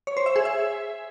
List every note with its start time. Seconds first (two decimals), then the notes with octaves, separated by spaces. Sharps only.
0.07 C#5
0.17 C5
0.26 E5
0.36 G#4
0.45 E5